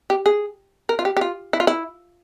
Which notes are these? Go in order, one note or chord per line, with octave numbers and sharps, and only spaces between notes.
G4
G#4
A#4
F4
G4
G4
F4
E4
F4
E4